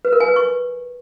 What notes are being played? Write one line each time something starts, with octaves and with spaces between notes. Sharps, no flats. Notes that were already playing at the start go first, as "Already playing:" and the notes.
B4
A#4
G#5
B4
C#6